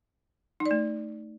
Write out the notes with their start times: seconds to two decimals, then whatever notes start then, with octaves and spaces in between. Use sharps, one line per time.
0.60 D#4
0.66 D5
0.71 A3